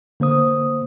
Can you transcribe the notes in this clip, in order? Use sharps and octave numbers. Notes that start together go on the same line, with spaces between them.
D3 A#3 C5 D#6